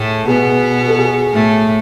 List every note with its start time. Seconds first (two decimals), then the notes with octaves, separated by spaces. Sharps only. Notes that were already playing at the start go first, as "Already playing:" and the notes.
Already playing: A2 A3 G#4
0.27 B2 B3 G#4
0.88 A4
0.99 G#4
1.33 A2 A3